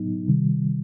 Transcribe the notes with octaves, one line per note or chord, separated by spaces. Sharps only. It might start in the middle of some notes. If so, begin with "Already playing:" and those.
Already playing: A2 F#3 B3 D#4
C3 D#3 G3